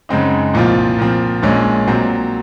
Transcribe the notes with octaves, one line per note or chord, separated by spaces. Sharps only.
F#2 C#3 G#3 C4 D#4
C2 A#2 F3 C4 F4
A#2 F3 C4
A#1 A#2 G#3 C#4
A#2 F#3 C4